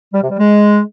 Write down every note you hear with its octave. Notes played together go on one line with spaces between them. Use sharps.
G3
C3
G3
G#3